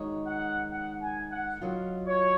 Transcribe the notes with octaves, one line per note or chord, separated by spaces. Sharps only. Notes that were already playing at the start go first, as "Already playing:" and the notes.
Already playing: D#3 G#3 D#4 F#4 C#5
F#5
F#5
G#5
F#5
F#3 C#4 F4 A#4 D#5
C#5